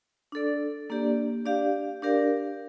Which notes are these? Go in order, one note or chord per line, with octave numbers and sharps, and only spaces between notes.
D4 A4 D5
A#3 D4 G4 D5
D4 G4 D5 F5
D4 G4 A#4 D5 F5